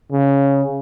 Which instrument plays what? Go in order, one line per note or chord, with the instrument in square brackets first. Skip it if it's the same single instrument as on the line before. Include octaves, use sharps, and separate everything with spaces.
[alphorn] C#3